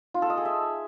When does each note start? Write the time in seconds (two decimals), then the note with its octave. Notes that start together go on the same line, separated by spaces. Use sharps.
0.14 F4
0.22 A4
0.30 D#5
0.38 G#4
0.45 E5